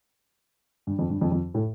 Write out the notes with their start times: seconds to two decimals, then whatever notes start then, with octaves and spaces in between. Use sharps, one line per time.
0.87 G2
0.99 F2
1.10 G2
1.21 F2
1.32 F2
1.54 A2